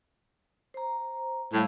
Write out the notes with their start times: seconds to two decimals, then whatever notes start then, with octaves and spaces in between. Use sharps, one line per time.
0.74 C5 A#5
1.53 A2 G3 F5